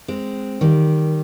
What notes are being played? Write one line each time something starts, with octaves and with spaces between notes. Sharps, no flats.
G#3 C4
D#3 G3